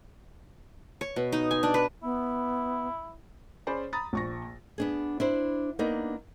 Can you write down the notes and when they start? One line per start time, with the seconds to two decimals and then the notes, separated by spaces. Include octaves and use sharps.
1.01 C#5
1.16 B2
1.32 D#4
1.51 G#5
1.63 D4
1.74 B4
2.03 B3 E4
3.67 C#4 G#4 C5 D5 G#5 B5
3.93 A#5 B5 D#6 A6
4.13 A#1 C#6 A#6
4.78 B3 D4 G#4
5.20 D4 E4 C5
5.79 A#3 B3 D4 D#4